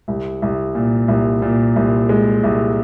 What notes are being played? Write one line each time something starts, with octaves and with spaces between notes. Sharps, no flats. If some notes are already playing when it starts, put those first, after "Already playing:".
C2
C2
A#2
C2
A#2
C2
G#3
C2